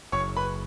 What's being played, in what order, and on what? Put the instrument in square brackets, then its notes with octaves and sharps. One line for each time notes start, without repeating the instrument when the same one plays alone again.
[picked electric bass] F#1 [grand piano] C#5 C#6
[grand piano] B4 B5